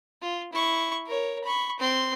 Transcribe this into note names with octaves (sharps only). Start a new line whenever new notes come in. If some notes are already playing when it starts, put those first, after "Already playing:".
F4
E4 C#6
A#4 C#5
B5 C#6
C4 C6